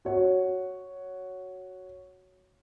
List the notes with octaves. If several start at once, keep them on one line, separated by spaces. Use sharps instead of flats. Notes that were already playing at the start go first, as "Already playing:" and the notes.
F#4 C#5